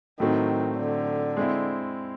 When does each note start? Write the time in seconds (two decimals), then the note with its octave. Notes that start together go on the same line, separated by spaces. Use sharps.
0.20 A2 D#3 F#3 A3 C4
0.78 D3
1.37 G#3 C4 E4